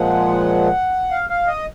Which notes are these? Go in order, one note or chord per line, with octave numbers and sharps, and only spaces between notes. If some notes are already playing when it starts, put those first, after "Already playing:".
Already playing: A#2 F3 G#3 F#5
F5
F5
D#5